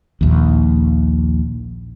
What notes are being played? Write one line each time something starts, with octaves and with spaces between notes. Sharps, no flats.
A#1 D#2